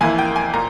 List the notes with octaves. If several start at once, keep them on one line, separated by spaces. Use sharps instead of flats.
F2 E3 A#3 E4 G#5
G5
G#5
A#2 A#5